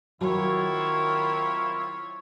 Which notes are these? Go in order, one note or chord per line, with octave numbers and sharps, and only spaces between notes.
D#3 F#3 C4 E4 F4 C#5